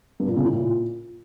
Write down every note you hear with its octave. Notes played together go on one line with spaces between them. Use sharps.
G2
A#2
C#3
A2
A#2